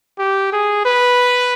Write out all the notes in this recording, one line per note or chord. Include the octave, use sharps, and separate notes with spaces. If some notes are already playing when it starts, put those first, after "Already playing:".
G4
G#4
B4